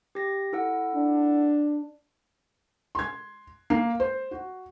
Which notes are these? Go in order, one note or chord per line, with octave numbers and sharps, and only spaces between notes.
G4 A#6
E4 A4 F#5
D4
C6 G#6
A#3 C7
C5
F#4